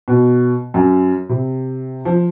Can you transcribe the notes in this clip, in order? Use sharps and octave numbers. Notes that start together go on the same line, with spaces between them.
B2
F#2
C3
F3